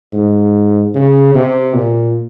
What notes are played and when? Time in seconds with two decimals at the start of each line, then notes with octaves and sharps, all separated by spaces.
0.13 G#2
0.95 C#3
1.35 C3
1.74 A#2